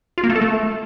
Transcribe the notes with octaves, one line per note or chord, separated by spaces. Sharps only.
F4
A#3
A3
A4
A3